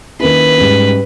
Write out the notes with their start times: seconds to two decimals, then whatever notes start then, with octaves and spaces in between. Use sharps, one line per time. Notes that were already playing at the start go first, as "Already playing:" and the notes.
0.20 D#3 A#3 C#4 E4 B4
0.58 G#2 G3 C#4